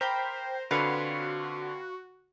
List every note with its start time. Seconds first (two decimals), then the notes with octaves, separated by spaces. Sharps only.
0.01 G4 A#4 C5 G5 B5
0.71 D3 C4 F4 F#4 B4 C#5 F5